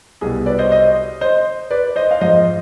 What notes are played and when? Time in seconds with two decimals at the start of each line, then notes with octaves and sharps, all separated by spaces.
0.21 C2 B2 G3 G#4
0.46 B4 D5
0.59 C5 D#5
0.71 C5 D#5
1.21 C5 D#5
1.71 B4 D5
1.96 C5 D#5
2.11 F5
2.21 G#2 F3 C5 D#5